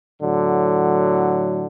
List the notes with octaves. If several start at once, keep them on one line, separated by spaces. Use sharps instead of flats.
A2 D3 F#3